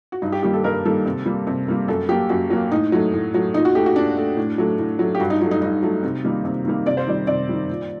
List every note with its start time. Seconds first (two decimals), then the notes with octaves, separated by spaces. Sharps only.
0.12 F#4
0.22 G2 D#4
0.32 G4
0.43 D#3 G3 A#3 G4
0.53 A4
0.64 G2 A#4
0.85 D#3 G3 A#3 A4
1.06 C3
1.26 G3 A#3
1.47 C3
1.68 G3 A#3
1.88 F#2 A4
2.09 F#3 A#3 G4
2.29 F#2 F#4
2.50 F#3 A#3
2.71 A2 D#4
2.92 F#3 A3
3.13 A2
3.34 F#3 A3
3.54 A#2 D#4
3.65 F#4
3.75 A3 G4
3.86 F#4
3.95 A#2 D4
4.17 A3
4.37 A2
4.58 F#3 A3
4.79 A2
4.99 F#3 A3
5.15 G4
5.20 G2 F#4
5.30 D#4
5.41 F#3 D#4
5.45 A3
5.51 D#4
5.62 G2 D#4
5.83 F#3 A3
6.03 C3
6.24 D#3 G3 A#3
6.45 C3
6.65 D#3 G3 A#3
6.86 C3 D5
6.97 C5
7.07 D#3 G3 D5
7.27 C3 D5
7.49 D#3 G3
7.69 A#2